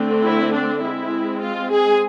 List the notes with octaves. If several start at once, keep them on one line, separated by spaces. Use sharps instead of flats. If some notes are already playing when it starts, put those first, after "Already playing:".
Already playing: D3 A3 C4
E4
D4
G#3 C4 E4
F4
G#4